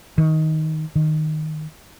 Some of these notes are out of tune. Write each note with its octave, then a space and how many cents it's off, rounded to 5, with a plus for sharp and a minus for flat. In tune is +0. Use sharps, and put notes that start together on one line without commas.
D#3 +15
D#3 -5